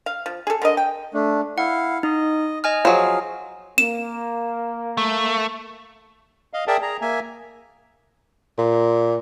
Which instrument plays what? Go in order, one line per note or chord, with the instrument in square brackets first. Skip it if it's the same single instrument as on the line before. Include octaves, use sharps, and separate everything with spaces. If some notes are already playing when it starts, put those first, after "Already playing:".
[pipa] F5
F3
G#4 A4
D3 A#4 D#5
G5
[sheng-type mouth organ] A3 D4
[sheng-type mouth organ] E4 F5 [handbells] F#5
[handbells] D#4 [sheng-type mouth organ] D#5
[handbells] D#5 G#5 F6
[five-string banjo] F3 F#3 [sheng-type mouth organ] G#4 F5
[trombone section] A#3 [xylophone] E7
[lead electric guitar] A3
[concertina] D#5 F5
G#4 A#4 D5 E5 G5 A5
G#4 A#5
A#3 E5 G#5
[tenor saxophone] A#2